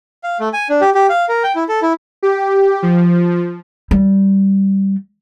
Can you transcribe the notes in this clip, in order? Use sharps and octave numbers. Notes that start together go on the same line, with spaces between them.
F5
A3
G#5
D4
G4
G4
F5
A#4
G5
E4
A4
E4
G4
F3
G3